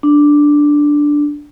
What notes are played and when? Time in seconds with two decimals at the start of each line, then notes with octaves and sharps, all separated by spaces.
0.03 D4